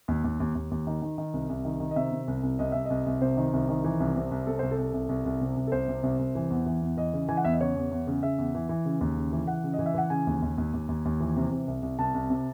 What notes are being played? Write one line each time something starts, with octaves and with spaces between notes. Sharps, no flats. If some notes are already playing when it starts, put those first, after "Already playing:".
D#2
D#2
D#2
D#2
D#2
D#3
D#3
D#3
C2
C2
D#3
D#3
D#5
C3 E5
C3
C2
C2
C2 D#5
C2 E5
D#5
C2
C2
C3 C5
D#3
C2
D#3
E3
C2
C3
C2
C3 A4
C2 C5
A4
C2
C2
C2
C2
C3
C2
A4
C2 C5
C3
C2
C2
E3
E2
E3
E2
E3 D#5
C#3
E3 G#5
F#5
E2 E5
D#5
C#3 C#5
E2
E2
C#3
C#3 E5
E2
E3
E3
C#3
D#2
C#3
E3
E3 F#5
C#3
D#5
E3
E5
E3 F#5
C#3 G#5
D#2
D#2
D#2
D#2
D#2
D#2
E3
C3
C3
C2
C2
C2 A5
C2
C3